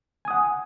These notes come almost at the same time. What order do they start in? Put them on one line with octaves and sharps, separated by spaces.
G#5 D#6 F#5